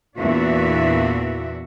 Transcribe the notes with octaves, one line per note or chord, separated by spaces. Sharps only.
E2 A#2 D4 F#4 E5